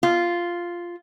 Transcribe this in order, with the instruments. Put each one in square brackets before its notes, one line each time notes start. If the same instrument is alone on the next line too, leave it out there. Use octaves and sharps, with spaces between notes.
[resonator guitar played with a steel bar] F4